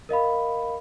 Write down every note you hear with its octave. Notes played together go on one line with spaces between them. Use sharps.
A#4 D#5 F5 B5